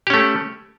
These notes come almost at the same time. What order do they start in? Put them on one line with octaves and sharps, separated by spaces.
G4 C#4 A3